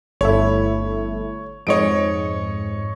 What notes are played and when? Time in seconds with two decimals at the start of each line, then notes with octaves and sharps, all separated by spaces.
0.21 G1 A3 E4 C#5
1.67 F2 G#2 C#5 D#5 C#7 D7